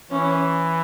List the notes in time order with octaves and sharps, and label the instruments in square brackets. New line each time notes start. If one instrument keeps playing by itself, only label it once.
[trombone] E3 [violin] C#4